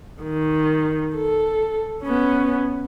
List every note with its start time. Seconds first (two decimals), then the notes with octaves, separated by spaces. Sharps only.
0.23 D#3
1.16 A4
2.03 B3 C#4